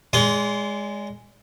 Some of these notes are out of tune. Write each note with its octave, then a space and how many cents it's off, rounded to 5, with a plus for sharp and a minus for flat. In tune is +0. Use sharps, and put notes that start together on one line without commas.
G#3 -5 D5 -40 C6 +0